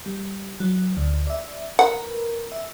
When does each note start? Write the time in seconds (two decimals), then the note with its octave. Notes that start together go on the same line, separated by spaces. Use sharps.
0.06 G3
0.60 F#3
0.97 D2
1.27 D5 E5
1.79 A#4 B4 F#5
2.52 E5